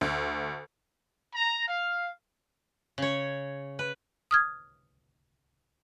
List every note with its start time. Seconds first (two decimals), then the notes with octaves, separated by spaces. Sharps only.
0.01 D2
1.35 A#5
1.68 F5
2.98 C#3 C#5
3.79 B4
4.31 D#6 F6 G#6